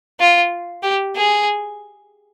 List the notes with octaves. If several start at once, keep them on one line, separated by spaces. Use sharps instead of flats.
F4
G4
G#4